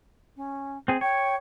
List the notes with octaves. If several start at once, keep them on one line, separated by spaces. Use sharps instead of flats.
C#4
C4 G#4
C#5 G5